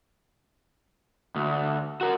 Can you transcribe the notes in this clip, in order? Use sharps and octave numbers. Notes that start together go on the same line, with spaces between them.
D2
F#4 A#4